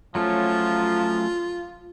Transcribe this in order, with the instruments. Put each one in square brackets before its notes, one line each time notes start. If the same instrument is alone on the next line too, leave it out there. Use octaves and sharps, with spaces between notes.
[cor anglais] F3 [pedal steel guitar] F#3 A3 C#4 [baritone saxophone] F4